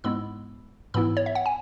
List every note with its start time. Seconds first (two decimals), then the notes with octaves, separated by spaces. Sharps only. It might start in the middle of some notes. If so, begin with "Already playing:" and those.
0.04 G#2 G#3 B3 E4 B5 E6
0.94 G#2 E3 B3 E4 B5 E6
1.17 C#5
1.26 E5
1.35 F#5
1.46 G#5